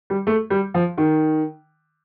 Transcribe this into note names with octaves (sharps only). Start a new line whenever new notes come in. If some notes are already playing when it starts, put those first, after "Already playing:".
G3
A3
G3
F3
D#3